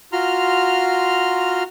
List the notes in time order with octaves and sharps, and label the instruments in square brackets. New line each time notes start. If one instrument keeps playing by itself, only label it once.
[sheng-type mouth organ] F4 F#4 A#5 C6 F6